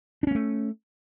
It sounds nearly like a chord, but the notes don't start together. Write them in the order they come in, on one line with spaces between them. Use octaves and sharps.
D4 C#4 A#3 A3